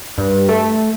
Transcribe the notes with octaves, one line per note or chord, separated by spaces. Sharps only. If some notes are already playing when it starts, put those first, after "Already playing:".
G2
A3